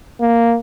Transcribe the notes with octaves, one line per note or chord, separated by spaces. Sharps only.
A#3